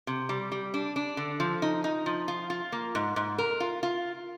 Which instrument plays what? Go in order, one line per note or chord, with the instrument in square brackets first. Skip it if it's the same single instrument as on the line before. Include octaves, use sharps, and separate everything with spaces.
[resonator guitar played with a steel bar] C3
G3
G3
D4
D4
D3
F3
D#4
D#4
F3
F4
F4
A#3
G#2
G#2
A#4
F4
F4